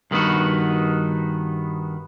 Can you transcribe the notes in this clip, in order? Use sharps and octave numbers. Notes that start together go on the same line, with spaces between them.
G2 D#3 B3 D#4 F#4